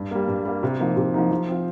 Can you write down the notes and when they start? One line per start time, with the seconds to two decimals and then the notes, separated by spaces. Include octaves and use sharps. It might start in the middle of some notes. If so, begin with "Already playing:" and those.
Already playing: G2
0.11 G3 A#3
0.28 G2
0.45 G3 A#3
0.63 C3
0.79 F3 A#3 D#4
0.97 C3
1.14 F3 A#3 D#4
1.31 F3
1.49 C4 F4